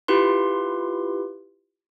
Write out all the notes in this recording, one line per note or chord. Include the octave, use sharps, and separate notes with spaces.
E4 F4 G4 B4 C6